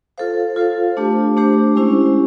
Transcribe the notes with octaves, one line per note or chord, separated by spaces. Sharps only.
F4 A4 C5 F5
F4 A4 C5 F5
A3 D4 G4 C5
A3 D4 G4 C5
G#3 C#4 E4 G4 C5